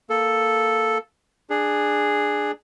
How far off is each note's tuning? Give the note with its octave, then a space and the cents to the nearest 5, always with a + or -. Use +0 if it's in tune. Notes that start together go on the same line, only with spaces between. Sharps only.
A#3 +0 A4 +0
D4 +15 G#4 +0